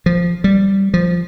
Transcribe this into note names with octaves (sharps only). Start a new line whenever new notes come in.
F3
G3
F3